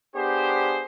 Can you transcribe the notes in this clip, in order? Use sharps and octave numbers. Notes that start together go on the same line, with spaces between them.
B3 D4 G4 G#4 C5